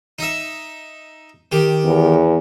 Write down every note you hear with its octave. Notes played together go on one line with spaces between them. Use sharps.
D#4 E5
D#3 G4
E2